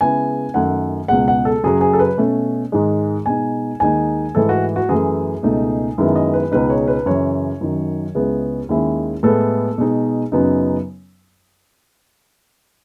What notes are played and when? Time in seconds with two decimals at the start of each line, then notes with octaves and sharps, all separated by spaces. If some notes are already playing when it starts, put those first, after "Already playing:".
0.01 C#3 G#3 B3 E4 G#5
0.54 F#2 D#3 A3 F#5
1.08 C#2 B2 G#3 F#5
1.28 F#5
1.45 A4
1.63 F#2 C#3 F#3 C#4 G#4
1.81 G#4
1.93 A4
1.99 B4
2.18 B2 A3 C#4
2.72 G#2 D#3 G#3 D#4
3.26 B2 G#3 D#4 G#5
3.80 D#2 D#3 G#3 D#4 G#5
4.35 G#2 E3 A3 E4 A4
4.49 F#4
4.76 F#4
4.89 F#2 E3 A3 G#4
5.43 C#2 B2 A3 D#4
5.98 F#2 D#3 G#3 B3 E4
6.16 D#5
6.34 B4
6.52 C#2 B2 G#3 B3 D#4 B4
6.70 C#5
6.88 B4
7.06 F#2 C#3 E3 C#5
7.61 F#2 D#3 F#3
8.15 C#2 C#3 G#3 B3 E4
8.69 D#2 D#3 G#3 C#4 E4
9.23 A2 G#3 B3 E4 A4
9.78 B2 G#3 D#4
10.32 F#2 C#3 F#3 B3 D#4